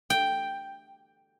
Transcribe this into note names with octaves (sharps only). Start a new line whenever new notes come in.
G5